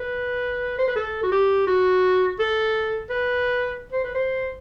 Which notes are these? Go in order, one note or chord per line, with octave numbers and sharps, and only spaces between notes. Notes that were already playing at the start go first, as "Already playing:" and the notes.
Already playing: B4
C5
B4
A4
F#4
G4
F#4
A4
B4
C5
B4
C5